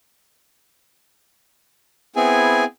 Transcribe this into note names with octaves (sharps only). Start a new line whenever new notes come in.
B3 C4 E4 G#4 G#5